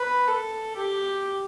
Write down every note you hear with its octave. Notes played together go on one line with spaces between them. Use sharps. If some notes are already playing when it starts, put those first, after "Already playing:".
Already playing: B4
A4
G4